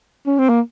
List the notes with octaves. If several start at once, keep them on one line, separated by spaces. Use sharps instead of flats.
C#4
C4
A#3